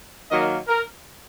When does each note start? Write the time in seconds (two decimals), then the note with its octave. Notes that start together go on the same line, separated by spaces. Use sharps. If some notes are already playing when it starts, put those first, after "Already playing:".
0.30 D#3 F#3 A#3 D#5
0.68 A#4